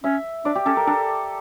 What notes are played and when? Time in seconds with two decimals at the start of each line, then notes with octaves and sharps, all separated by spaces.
0.04 C#4 E5
0.45 D4 D5
0.55 G4
0.66 C#4 A4
0.77 A#4
0.87 D4 A4